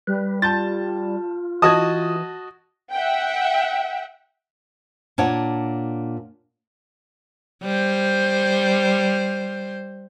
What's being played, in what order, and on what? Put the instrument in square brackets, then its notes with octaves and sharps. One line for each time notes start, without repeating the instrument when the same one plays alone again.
[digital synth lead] G3 [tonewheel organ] B4
[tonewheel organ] F4 [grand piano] A5 G6 A6
[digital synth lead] E3 [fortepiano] F#4 D#5 A5 [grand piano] D#6 G#6
[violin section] E5 F#5 G5
[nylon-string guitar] A#2 D4 C#5 F#5
[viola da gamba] G3 C5